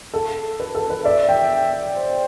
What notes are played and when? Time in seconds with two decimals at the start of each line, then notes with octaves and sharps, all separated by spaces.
0.14 A4
0.60 B4
0.75 A4
0.90 B4
1.05 D5 E5
1.29 G5
1.97 C5